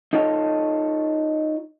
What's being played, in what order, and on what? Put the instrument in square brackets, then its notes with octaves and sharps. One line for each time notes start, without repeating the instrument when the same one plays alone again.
[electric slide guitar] D#4 F4 A4 C#5 D#5